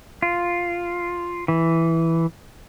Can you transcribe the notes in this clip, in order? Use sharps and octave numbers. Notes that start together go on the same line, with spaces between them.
F4
E3